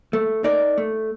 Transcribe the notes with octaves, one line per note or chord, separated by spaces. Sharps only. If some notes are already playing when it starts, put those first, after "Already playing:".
A3
D#4 A#4 D5
A3